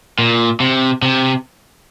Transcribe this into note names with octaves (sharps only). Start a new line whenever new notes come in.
A#2
C3
C3